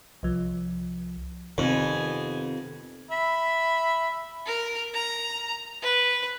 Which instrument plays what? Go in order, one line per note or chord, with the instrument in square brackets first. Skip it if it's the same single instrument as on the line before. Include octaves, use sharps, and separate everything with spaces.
[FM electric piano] C2 F3
[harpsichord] F2 [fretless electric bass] C3 D#3 [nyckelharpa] B3 G#5
[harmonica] E5 B5
[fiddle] A#4
A#5
B4